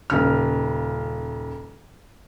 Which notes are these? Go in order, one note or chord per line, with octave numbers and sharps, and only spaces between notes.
D#1 C#3 F6